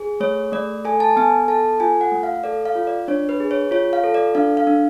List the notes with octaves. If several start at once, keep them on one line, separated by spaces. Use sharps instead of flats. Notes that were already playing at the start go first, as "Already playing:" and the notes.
Already playing: G#4
A3 C#5
A3 D5
A4 G#5
A5
B3 G#5
A4 A5
F4 G#5
F#5
A3
F5
A4 D5
F5
F4
D5
D4 C#5
B4
G#4
C#5
F4 C#5
F5
A4
D5
D4 F5
F5
D4